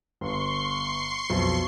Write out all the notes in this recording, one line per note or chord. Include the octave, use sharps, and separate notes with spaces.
G1 C6 C#6 C7
B1 F2